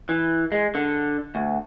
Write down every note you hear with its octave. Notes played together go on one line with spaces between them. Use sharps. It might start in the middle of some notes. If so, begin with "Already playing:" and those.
E3
G#3
D3
D2